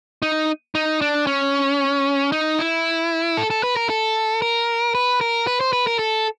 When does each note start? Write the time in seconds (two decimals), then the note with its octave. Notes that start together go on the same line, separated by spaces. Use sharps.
0.22 D#4
0.75 D#4
1.01 D4
1.27 C#4
2.32 D#4
2.59 E4
3.37 A4
3.50 A4
3.63 B4
3.77 A#4
3.90 A4
4.42 A#4
4.95 B4
5.21 A#4
5.47 B4
5.61 C5
5.73 B4
5.87 A#4
5.99 A4